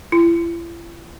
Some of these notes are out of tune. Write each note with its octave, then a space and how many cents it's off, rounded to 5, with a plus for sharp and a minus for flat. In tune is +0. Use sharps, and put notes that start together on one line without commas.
E4 +40